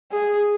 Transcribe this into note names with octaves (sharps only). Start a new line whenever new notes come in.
G#4